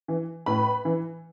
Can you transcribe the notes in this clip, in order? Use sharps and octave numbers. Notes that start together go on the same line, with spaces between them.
E3
A2 B4 B5
E3